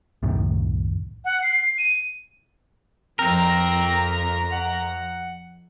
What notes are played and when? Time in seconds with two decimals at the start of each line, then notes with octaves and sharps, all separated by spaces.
0.23 C2 F#2 A2 D#3
1.25 F#5
1.42 C7
1.78 D#7
3.19 F2 C4 A#4 A#5
4.52 F#5